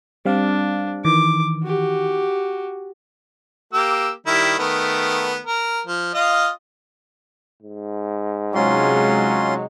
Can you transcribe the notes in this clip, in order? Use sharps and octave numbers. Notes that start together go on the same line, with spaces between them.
G3 C4 D4 F5
D#3 E3 D6
F#4 G4
A#3 G4 E6
D#3 G3 E4
D#3 A3 B3
A#4
F3
F4 D#5 F5
G#2
C3 F#3 G#3 C#4 D#4 F4 C6